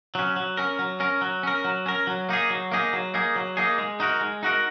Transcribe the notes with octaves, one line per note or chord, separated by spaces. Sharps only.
F#3 C#4
F#3
C#4 A#4
F#3
C#4 A#4
F#3
C#4 A#4
F#3
C#4 A#4
F#3
A#3 D#4 G#4
F#3
A#3 D#4 G#4
F#3
A#3 D#4 G#4
F#3
A#3 D#4 G#4
G#3
D#4 F#4 A#4
G#3
D#4 F#4 A#4